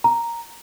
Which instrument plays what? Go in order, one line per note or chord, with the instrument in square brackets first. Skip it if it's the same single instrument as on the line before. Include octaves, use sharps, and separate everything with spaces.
[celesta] A#5